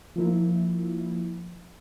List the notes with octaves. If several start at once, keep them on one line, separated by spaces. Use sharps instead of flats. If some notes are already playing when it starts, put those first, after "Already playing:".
F3 A#3 E4